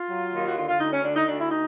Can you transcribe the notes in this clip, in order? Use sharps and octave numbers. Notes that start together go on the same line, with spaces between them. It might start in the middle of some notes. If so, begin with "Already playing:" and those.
Already playing: F4
F#3
D#2
F#4
D3 F4
F4
D2 D#4
C#4
D3 D4
D#4
D2 D4
E4
D#4